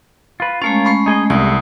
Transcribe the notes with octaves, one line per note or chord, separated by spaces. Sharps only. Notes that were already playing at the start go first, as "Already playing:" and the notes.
F4 B4
G#3 A3 C#4 F4 A#4 C#5
B5 C#6 C7
D#4 G#4 D#5
C2 G#3 A3 D#6